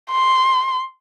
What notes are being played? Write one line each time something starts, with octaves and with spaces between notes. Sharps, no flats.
C6